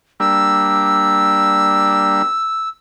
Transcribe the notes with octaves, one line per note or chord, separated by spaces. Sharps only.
G3 A#3 D4 E6